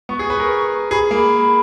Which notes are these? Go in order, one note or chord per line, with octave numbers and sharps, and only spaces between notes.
B3 C#6
G#4
B4
A#4
G#4 B5
A#3